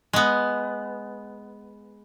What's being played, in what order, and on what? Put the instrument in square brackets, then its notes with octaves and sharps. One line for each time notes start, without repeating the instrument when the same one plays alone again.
[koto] G#3 B3